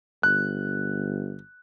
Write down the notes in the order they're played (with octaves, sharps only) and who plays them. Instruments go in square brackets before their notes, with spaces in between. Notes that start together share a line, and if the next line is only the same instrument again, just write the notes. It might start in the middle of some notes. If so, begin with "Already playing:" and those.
[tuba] G1 [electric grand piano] F#6